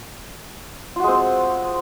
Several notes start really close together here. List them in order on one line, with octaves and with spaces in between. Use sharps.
F4 F#4 G#3 C4